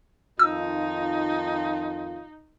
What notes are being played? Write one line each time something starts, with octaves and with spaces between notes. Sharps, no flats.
F2 D#3 D#4 F4 E6